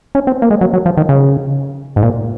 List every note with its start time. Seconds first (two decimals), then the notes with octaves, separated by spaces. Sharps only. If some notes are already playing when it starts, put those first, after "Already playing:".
0.15 C#4
0.27 C4
0.42 A#3
0.51 G#3
0.61 F#3
0.73 F#3
0.86 F3
0.97 D#3
1.09 C#3
1.96 G#2
2.03 A#2